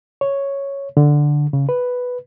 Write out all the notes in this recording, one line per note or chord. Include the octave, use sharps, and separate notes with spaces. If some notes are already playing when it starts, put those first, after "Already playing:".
C#5
D3
C#3
B4